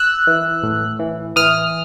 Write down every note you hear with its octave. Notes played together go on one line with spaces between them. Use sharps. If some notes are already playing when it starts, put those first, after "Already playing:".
Already playing: E6 F#6
E3
A2
E3
E3 D#6 F6